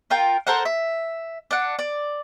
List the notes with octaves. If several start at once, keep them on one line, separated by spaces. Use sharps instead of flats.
F4 A#4 G5
A4 A#4 C5 F#5
E5
D4 F#5
D5